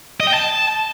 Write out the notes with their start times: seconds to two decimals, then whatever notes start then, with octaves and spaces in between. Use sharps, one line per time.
0.20 D#5
0.27 G5
0.34 A5